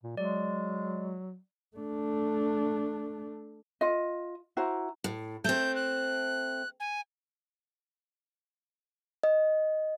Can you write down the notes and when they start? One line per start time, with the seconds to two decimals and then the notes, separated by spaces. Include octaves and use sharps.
0.04 A#2
0.17 F#3 G#3 D5
1.77 A3 D4
3.81 F4 D#5
4.57 E4 F#4 C5 A#5
5.04 A2
5.44 A3 C4 G6
5.75 F#6
6.80 G#5
9.23 D#5